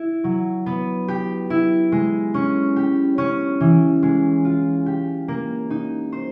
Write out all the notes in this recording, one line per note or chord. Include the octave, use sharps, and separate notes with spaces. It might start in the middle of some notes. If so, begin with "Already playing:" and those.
Already playing: E4
F#3
B3
G4
E4
G#3
C#4
G4
C#4
E3
G#3
F4
G4
A#3
D#4
C5